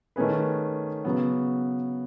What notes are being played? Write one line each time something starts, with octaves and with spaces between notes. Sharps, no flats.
D#3 A3 C#4 G#4 B4
C#3 F#3 B3